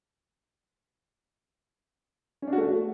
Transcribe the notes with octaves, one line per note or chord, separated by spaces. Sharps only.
C#4
D4
F#4
A3